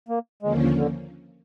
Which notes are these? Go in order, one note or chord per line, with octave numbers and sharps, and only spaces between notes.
A#3
D#2 D3 F3 G#3 A#3 C#4
D3